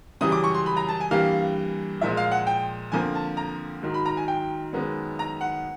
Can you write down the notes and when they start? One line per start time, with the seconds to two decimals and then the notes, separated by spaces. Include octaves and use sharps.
0.21 F#2 C#3 E3 G3 D#6
0.32 D6
0.44 C#6
0.54 C6
0.66 B5
0.77 A#5
0.89 A5
1.00 G#5
1.11 G2 E3 G3 A#3 F5
2.01 A#2 F3 G#3 E5
2.17 F5
2.31 F#5
2.47 G5
2.92 F2 D3 F3 A#3 G#5
3.15 A5
3.37 A#5
3.82 G#2 D#3 F#3
3.94 B5
4.06 A#5
4.17 G#5
4.28 G5
4.73 F#2 D#3 G#3 B3
5.19 A#5
5.41 F#5